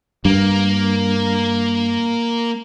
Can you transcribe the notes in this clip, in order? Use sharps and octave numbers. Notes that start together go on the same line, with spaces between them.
G2 A#3